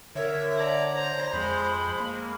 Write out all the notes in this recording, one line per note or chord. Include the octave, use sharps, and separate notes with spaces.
D3 A#4 C#5 E5
D5 A#5
C5 A#5
F2 G#3 B5
A#3